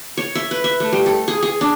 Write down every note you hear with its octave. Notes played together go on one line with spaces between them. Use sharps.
C#5
E5
B4
E5
A3
G3
A4
G#4
G#4
D4